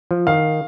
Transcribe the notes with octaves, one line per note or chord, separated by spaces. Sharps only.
F3
D#3 F5